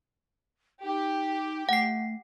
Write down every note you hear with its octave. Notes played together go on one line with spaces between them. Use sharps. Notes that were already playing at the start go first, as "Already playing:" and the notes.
D#4 G4
A3 F#5 C7